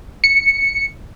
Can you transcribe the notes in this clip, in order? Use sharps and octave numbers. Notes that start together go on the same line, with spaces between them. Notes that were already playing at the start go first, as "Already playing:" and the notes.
C#7